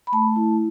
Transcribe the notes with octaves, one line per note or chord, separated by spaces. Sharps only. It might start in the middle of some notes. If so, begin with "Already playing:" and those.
B5
A3 A5
E4